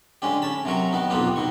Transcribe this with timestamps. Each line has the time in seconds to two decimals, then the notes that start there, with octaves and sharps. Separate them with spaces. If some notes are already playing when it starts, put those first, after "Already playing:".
0.22 D3 G#3 C#4 G4
0.42 C#4 A5 B5
0.65 C3 F#3 A#4 C#6
0.93 D#3 B3 D#4
1.10 B1 F2 A#3 B3 F4 G4
1.36 B2 D#3 C#6